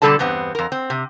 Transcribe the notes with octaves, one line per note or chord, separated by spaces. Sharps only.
B2 D3 G3 A4 D5 A5
E2 G2 B3 C4
F2 A#4
C4
C3